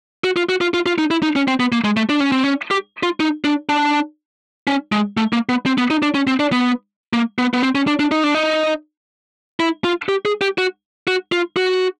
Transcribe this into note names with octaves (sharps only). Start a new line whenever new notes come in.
F#4
F4
F#4
F4
F4
F4
D#4
E4
D#4
C#4
C4
B3
A#3
G#3
A3
D4
C#4
C4
C#4
G4
F4
D#4
D4
D4
C#4
G#3
A3
A#3
B3
C4
B3
D#4
D4
C#4
C4
D4
B3
A#3
B3
B3
C4
C#4
D4
D4
D#4
D4
D#4
E4
F4
G4
G#4
G4
F#4
F#4
F4
F#4